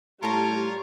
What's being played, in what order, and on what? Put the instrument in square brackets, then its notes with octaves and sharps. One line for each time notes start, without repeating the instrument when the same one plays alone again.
[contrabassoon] A2 [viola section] G3 [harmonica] F4 A#4 C#5 [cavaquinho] A4 A5 A#5